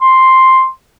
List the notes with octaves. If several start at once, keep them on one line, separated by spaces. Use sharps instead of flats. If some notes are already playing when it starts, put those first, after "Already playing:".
C6